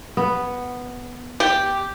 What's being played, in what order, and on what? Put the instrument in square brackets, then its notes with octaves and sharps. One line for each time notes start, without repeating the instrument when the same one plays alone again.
[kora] B3
[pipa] G4